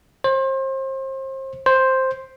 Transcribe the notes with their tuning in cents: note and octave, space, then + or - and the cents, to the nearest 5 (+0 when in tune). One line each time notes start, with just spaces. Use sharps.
C5 +35
C5 +5